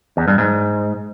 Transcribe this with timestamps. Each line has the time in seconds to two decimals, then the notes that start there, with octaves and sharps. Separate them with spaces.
0.17 E2
0.28 G2
0.38 G#2